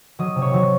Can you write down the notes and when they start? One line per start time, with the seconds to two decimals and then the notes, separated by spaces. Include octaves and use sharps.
0.19 F#3 D#5
0.36 C3
0.42 C#5
0.54 F#3